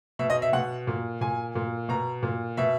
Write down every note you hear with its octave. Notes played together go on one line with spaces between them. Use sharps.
B2 E5
D#5
E5
B2 F#5
A#2
A#2 G#5
A#2
B2 A#5
A#2
B2 E5